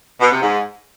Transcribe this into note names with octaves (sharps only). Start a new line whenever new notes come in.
B2
C3
G#2